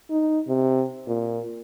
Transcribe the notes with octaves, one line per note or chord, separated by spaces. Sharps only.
D#4
C3
A#2